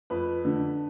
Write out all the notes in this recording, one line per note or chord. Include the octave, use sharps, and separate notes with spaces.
F2 B4
D3